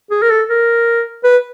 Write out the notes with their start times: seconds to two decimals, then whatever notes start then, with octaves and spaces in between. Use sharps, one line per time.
0.11 G#4
0.22 A#4
0.30 A4
0.49 A#4
1.24 B4